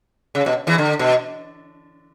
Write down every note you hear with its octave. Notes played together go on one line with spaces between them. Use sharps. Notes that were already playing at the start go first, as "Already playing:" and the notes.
C#3
B2
E2 E3
D3
B2